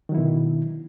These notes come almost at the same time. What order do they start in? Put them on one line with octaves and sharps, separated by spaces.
D#3 F#3 E4 B2 D3